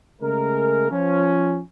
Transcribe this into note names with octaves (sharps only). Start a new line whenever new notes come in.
C#3 G#3 A3 G#4 A#4
F3 C#4